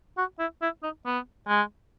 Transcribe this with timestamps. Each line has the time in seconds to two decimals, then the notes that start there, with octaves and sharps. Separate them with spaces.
0.17 F#4
0.39 E4
0.62 E4
0.83 D#4
1.05 B3
1.48 G#3